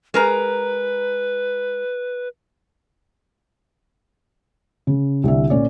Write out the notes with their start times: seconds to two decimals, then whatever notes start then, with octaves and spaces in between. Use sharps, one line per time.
0.14 G#3 A#4 B4 A#5
4.87 C#3
5.23 C2 D3 E5
5.50 A#2 C#4 D5